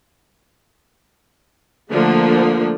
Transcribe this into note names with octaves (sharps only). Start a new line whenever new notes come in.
D3 F3 A3 A#3